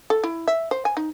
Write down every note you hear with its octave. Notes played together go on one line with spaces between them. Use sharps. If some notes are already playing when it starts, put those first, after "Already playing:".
A4
E4
E5
C5
G#5
D#4